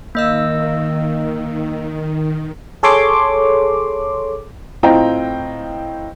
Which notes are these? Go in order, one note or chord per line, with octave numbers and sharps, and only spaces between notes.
D#3 A#3 D#5 E6
G#4 A4 C#5 C6 D6
A2 C4 F4 D#5 G5 A#5